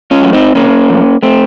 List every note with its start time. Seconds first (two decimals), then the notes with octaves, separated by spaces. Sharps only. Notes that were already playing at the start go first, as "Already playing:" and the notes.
0.11 C#4 F4
0.22 F#3 A3
0.33 C4 D#4
0.55 C3 A#3 C#4
0.89 F3 A3
1.23 A3 C4